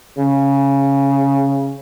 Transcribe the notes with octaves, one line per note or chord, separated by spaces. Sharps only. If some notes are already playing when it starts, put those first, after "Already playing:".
C#3